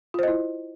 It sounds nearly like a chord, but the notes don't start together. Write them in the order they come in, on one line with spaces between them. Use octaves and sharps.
F4 C5 D#5 E4